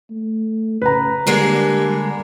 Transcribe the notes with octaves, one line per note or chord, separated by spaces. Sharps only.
A3
C#3 B4 A#5
D3 G3 G#3 A#3